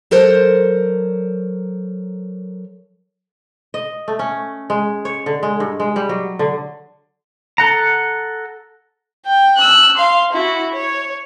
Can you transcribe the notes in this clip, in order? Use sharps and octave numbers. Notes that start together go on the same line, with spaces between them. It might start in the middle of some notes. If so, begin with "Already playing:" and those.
F#3 A4 A#4 C5
D#5
A3
C#4
G#3
C#5
D3
G#3
G2
G#3
G3
F#3
D3
A4 F#5 A#5
G5
E6 F#6
F5 C6
E4 F#4
C#5